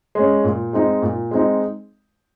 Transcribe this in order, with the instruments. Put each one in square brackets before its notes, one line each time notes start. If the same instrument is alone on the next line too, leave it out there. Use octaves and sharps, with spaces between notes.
[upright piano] G#3 C#4
A#2
G#3 C4 D#4
A#2
G#3 C4 D#4